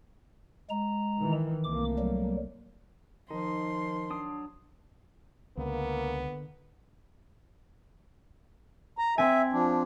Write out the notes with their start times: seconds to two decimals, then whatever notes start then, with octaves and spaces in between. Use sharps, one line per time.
0.70 G#3 A#5
1.20 D#3 E3
1.64 C2 A3 A#3 D6
1.98 F#3 G3
3.31 D#3 F3 D#4 C6
4.10 F#3 D4 D#6
5.57 C#2 D3 A#3 B3
8.98 A#5
9.18 C4 E5 G#5
9.53 F3 D4